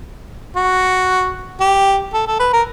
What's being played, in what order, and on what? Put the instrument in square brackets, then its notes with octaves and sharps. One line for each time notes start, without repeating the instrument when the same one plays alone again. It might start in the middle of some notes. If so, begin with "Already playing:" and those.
[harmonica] F#4
G4
A4
A4
B4
A#4